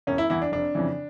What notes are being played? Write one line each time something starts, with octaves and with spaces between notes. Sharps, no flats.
E1 C#4
E4
E2 E3 E4
D4
F1 D4
F2 C#3 E3